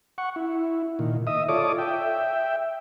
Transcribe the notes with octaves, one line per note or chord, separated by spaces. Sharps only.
F#5 C#6
E4
A#2 D#3
D#5 E5 D#6
F4 A4 C#5 D5 D6 D#6
E5 G5